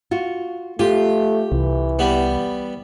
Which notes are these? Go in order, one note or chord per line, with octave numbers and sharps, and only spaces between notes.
F4 F#4
A3 F4 G4
C2 E3
G3 B3